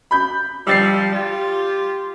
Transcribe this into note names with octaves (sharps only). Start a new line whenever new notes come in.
B5 G6
F3 G3 E6 A6 C7
F4 G4